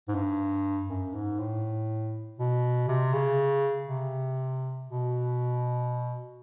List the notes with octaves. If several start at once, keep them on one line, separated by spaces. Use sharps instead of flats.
G#2
G2
F#2
G#2
A2
B2
C3
C#3
C3
B2